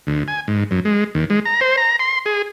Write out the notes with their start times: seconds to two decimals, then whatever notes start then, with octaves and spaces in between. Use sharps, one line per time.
0.07 D2
0.28 G#5
0.48 G#2
0.71 F#2
0.85 G#3
1.15 D#2
1.30 G#3
1.45 A#5
1.61 C5
1.77 A#5
1.99 C6
2.26 G#4